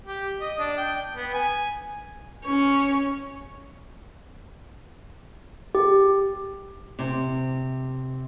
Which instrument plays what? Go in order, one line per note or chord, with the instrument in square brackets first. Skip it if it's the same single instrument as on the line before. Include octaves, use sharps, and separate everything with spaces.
[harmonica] G4
D#5
D4
G5
B3
G#5
[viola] C#4 C#5
[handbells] G4
[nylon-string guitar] C3